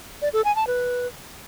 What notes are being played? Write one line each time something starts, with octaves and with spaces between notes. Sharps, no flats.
D5
A4
G#5
A5
B4